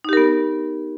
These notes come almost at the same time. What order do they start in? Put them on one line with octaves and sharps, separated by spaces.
D#4 G4 A#4 B3